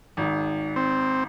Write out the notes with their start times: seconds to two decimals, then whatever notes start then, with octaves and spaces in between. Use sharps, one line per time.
0.17 G#1 G#2
0.76 C4